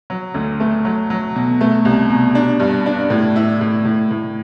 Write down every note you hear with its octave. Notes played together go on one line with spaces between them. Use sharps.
F#3
D2
A3
F#3
F#3
B2
A3
C2
B2
D4
G2
D4
A2
E4
A2
A2
A2